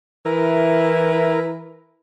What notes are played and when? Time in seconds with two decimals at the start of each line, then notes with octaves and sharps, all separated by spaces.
0.25 E3 E4 A#4